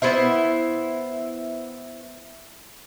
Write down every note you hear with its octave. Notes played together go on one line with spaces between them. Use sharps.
B3 E4 C5 E5